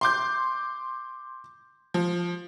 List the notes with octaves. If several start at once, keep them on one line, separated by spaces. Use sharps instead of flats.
C6 D6 G6
F3